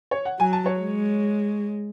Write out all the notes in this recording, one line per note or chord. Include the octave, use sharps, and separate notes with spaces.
C#5
F#5
F#3 G#5
A5
C#5
G#3